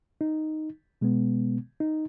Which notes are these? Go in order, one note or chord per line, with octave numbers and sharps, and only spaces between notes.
D#4
B2 G#3 B3
D#4